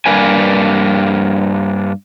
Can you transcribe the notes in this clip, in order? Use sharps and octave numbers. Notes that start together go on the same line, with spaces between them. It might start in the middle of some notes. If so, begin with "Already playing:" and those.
G2 A#3 B4 G#5